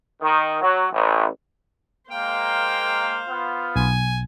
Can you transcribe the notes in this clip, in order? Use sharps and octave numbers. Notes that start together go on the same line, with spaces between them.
D#3
F#3
A1
G#3 A#3 C5 F5 G5
B3 F4
B1 G#5